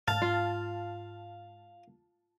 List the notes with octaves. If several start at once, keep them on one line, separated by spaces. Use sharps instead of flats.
G#2 F5 A5 F6 A6
F4